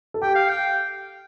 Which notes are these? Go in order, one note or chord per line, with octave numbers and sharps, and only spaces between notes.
A4
G4 G5
F5
G5